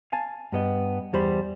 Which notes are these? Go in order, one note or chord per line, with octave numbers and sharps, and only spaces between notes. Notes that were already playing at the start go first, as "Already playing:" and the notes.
F5 G#5 A5
G2 B3 D#5
E2 G3 C5 B5